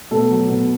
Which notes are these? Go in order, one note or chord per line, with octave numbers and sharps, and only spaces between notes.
B2 A3 A4
F#3
B2